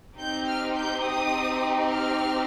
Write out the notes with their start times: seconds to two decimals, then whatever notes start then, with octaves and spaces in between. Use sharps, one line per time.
0.18 C4 D#4 G4 G6
0.47 F6
0.76 G6
1.04 D#6
1.89 F6